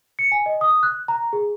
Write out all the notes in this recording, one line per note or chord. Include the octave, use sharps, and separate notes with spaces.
C#7
G#5
D#5
D#6
F#6
A#5
G#4